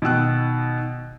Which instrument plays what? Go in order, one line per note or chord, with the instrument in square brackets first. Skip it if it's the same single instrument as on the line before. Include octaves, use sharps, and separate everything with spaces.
[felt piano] B2 D#3 E6 F#6